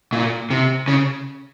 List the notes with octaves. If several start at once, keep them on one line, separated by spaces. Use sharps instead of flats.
A#2
C3
C#3